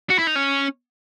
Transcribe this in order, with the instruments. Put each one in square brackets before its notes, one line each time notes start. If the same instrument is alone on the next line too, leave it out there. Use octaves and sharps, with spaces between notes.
[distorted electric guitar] F#4
E4
D#4
C#4